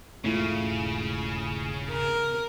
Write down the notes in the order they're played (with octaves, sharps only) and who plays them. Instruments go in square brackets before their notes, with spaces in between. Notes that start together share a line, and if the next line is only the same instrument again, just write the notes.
[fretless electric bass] E1 G#2 C#4 [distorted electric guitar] C#3 [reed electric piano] A3 E4 F4
[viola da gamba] A#4